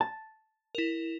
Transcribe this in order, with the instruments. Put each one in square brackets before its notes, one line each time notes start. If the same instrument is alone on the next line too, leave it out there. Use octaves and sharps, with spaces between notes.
[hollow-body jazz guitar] A5
[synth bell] E4 A#4